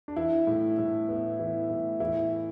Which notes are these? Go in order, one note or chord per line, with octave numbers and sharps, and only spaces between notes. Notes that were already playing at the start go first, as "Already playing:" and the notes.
D4
E3 E4
A2
A2
B3
E3
A2
E3 E4